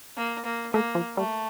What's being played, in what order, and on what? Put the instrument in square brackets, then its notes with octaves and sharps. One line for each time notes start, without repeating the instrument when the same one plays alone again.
[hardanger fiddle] A#3
A#3
[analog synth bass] A3 [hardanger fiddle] A#3
[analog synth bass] F3
[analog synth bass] G3 [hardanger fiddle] A3